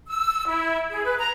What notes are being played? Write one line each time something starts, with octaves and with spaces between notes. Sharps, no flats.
E6
E4
G#4
B4
A#5